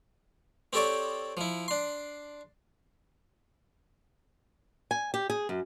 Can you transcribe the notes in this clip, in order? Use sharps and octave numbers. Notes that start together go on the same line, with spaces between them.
C4 G4 A4 C#5 D5
F3 E4
D4 C6
G#5
G4
G#4
F#2